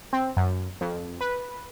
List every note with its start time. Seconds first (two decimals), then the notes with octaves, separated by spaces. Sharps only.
0.13 C4
0.37 F#2
0.81 F2
1.21 B4